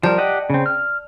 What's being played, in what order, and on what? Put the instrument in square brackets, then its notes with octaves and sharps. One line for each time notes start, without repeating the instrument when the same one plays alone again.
[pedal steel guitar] F3 G3 A#4 [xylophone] D5 A5 G6
[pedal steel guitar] G4 D#5 F#5
C#3 C4
F6